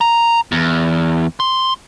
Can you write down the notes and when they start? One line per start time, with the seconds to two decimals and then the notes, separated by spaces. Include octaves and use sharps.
0.01 A#5
0.52 E2
1.40 C6